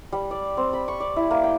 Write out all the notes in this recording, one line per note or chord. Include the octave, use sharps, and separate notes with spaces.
G3
D5
C4
B5
C#6
D5
E4
A#3
G5